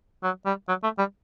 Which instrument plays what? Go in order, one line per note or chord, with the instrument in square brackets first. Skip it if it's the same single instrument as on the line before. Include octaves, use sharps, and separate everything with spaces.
[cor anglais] F#3
G3
F#3
A3
G3